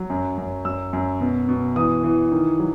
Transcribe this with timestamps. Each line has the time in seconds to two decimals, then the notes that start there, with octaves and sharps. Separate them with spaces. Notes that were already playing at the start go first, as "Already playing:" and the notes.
Already playing: F#3
0.10 F#2
0.38 F#2
0.65 F#2 E6
0.93 F#2
1.21 B2
1.48 B2
1.76 E3 D#6
2.04 E3
2.32 D#3
2.59 F#3